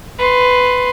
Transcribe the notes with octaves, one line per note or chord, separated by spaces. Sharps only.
B4 C6